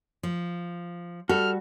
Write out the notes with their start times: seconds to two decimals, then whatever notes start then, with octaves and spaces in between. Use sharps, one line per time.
0.23 F3
1.29 G3 F#4 A4 F6